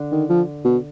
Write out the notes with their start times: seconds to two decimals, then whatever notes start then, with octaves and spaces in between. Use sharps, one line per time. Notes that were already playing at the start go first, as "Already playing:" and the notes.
Already playing: D3
0.12 D#3
0.29 F3
0.65 B2